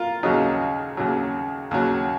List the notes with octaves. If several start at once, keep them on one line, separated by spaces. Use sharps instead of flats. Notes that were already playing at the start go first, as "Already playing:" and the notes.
Already playing: F4 A#4
D#2 C#3 F#3 D#4
D#2 C#3 F#3
D#2 C#3 F#3